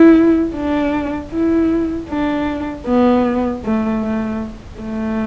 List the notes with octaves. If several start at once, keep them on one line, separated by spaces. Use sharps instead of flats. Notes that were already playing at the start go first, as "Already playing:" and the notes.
Already playing: E4
D4
E4
D4
B3
A3
A3
A3